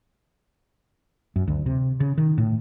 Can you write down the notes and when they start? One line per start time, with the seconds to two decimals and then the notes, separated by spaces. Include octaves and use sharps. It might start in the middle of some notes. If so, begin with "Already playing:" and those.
1.36 F#2
1.47 D2
1.66 C3
2.00 C#3
2.17 D#3
2.38 A2